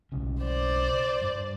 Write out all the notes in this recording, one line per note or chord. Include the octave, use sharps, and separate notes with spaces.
B1 C#3
C5 D5
G2